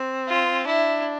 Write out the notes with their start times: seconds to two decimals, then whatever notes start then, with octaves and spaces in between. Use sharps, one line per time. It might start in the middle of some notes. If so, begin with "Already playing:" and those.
Already playing: C4
0.28 F4
0.66 D4 E4